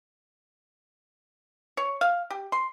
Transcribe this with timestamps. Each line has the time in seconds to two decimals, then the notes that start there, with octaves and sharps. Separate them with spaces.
1.77 C#5
2.01 F5
2.30 G4
2.52 C6